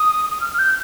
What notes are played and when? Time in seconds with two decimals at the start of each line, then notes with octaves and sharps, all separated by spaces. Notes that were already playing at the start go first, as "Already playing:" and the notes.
Already playing: D#6
0.30 D#6
0.41 F6
0.53 F6
0.59 G6